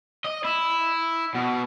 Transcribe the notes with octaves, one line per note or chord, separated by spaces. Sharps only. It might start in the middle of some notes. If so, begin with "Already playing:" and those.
D#5
E4
B2